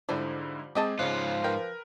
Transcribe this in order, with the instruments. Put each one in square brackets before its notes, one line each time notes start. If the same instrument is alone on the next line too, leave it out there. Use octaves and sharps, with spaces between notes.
[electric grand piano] G#2 D3 E4 [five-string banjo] F3 G3 C5
[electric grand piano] G#3 C4 G#4 [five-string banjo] G4 D#5 A5
[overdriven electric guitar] G#2 F4 [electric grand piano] C#3 C#5 F#6 [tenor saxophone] F3
[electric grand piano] A#4 B4 [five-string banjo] G5